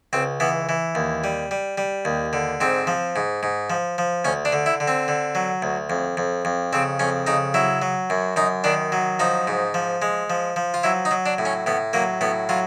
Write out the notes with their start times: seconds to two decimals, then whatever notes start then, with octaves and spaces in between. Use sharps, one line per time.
0.13 C#2 C4
0.40 E3 B3
0.69 E3
0.95 D#2
1.24 G3
1.51 G3
1.78 G3
2.05 D#2
2.33 D3
2.61 G#2 C4
2.87 F3
3.16 G#2
3.43 G#2
3.70 F3
3.98 F3
4.25 D2 C#4
4.45 D4
4.52 D3
4.66 E4
4.80 D3
4.88 C4
5.08 D3
5.35 F#3
5.62 D2
5.90 F2
6.17 F2
6.45 F2
6.73 C#3 C4
6.99 F2 C#4
7.27 C#3 D#4
7.54 F#3 E4
7.82 F#3
8.10 F#2
8.36 F#2 D#4
8.64 D#3 D4
8.92 F#3
9.19 F3 D#4
9.47 G#2
9.74 F3
10.02 G#3
10.30 F3
10.56 F3
10.74 F4
10.83 F#3 E4
11.05 D#4
11.11 F#3
11.26 D4
11.38 A2
11.45 C#4
11.66 A2 B3
11.93 F#3 A#3
12.21 A2 B3
12.49 F#3 F4